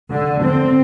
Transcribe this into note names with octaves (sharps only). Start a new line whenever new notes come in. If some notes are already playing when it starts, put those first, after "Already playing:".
D3
C4